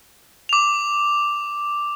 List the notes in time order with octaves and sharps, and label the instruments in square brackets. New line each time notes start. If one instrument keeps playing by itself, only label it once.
[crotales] D6 F7